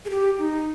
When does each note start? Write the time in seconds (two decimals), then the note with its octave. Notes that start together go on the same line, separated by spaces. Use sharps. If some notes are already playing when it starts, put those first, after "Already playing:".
0.05 G#4
0.10 G4
0.39 D#4